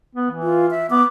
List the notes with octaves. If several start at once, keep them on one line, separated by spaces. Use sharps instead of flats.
B3
E3
F4
E5
B3 D6